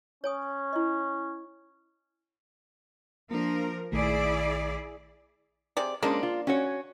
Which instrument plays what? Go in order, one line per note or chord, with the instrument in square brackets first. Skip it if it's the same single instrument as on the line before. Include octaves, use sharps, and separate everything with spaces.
[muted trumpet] C#4 [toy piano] C#5 G#5 D#6
[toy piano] E4 D#5
[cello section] F3 A#4 [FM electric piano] A#3 D4
[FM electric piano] A#1 D#3 A3 [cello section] E4 G#4 D5
[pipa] C3 G#4 D5
[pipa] F3 A#3 D4 [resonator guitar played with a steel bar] G#3 C#4
[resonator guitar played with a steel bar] F4
C#4 F#4 C#5